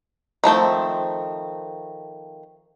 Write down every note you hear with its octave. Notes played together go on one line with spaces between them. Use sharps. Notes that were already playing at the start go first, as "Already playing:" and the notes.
D#3 F3 A3 C4